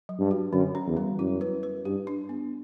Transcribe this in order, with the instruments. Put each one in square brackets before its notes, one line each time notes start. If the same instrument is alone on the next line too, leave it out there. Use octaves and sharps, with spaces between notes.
[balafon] F#3
[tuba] G2
[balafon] F#4
[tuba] F#2 [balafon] D3
[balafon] C#4
[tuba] E2
[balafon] G3
[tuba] F#2 [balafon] E4
[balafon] B4
B4
[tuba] G2 [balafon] G4
[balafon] D4
B3